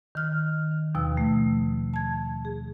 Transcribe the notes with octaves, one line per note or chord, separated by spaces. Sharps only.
D#3 F6 F#6
D#3
D#2 B2 F3 E6
A3
A5 G#6
G#4